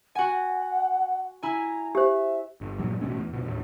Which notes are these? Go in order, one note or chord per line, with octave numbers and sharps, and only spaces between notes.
F#4 F#5 G#5
E4 G#5 A#5
G4 C5 E5
G1
G2 A#2 F#3 G3
A1 B2 A3 C#4
E2
F2 B2
D#2 A2